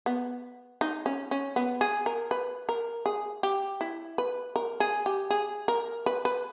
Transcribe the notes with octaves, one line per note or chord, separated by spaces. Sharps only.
B3
D#4
C#4
C#4
B3
G#4
A#4
B4
A#4
G#4
G4
E4
B4
A#4
G#4
G4
G#4
A#4
B4
B4